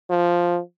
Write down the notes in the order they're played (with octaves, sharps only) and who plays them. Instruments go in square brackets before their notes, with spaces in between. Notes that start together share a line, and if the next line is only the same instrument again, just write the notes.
[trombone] F3